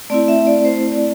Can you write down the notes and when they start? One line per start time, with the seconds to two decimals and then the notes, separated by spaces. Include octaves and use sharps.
0.10 A3 C4 E4 D5
0.28 E5
0.47 D5
0.65 C5
0.92 D5